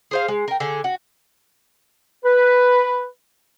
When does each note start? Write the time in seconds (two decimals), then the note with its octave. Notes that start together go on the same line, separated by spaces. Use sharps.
0.11 G#4 C5 F5
0.28 G#3
0.48 A#4 G5
0.60 D3 G#4
0.84 F#4
2.24 B4